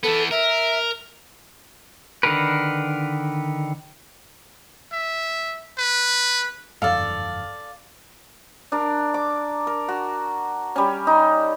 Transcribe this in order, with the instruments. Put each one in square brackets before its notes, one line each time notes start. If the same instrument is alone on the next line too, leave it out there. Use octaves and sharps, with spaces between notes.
[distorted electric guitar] E3 B3 [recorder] A4
[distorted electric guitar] A#4 [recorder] E5
[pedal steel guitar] D3 D#3 A#4 B4
[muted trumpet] E5
B4
[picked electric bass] G1 F2 G#2 [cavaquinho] A4 D5 [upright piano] F5
[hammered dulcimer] D4 A#4
D6
A#4
F#4
G3 C#4
D#4